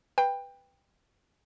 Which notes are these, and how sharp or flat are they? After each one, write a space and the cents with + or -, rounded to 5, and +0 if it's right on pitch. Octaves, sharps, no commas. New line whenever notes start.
B4 +0 G5 +20